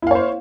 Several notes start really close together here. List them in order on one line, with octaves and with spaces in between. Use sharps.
E4 F5 C#5 C5